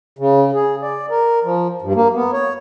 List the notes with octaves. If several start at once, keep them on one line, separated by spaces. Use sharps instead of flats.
C#3
G#4
D5
A#4
F3
G2
A#3
B3
C#5